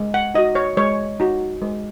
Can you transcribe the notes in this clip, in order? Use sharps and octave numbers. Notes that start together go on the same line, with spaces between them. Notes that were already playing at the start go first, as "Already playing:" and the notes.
Already playing: G#3
F#5
D#4 F#4 D#5
C#5
G#3 C#5
D#4 F#4
G#3